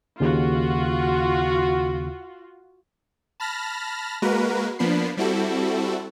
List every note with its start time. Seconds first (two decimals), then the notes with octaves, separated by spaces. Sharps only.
0.20 D#2 C#3 F4 F#4
3.40 A5 B5 F6 A#6
4.22 G#3 A#3 F#4 A#4 B4
4.79 F3 A#3 B3 D4 B5 C7
5.17 G3 C4 E4 F#4 A4